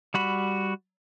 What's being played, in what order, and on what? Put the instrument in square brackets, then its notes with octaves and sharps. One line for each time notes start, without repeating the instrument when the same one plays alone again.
[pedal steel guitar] G3 F#4 B5